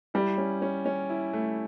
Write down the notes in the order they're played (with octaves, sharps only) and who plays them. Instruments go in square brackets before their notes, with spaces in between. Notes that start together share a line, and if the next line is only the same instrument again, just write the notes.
[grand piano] G3 [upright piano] E4
[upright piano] C#4
C#4
C#4
E4
A3